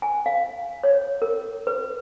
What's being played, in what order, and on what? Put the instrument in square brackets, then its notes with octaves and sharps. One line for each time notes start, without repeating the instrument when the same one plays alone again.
[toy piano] G#5
F5
C#5
A#4
B4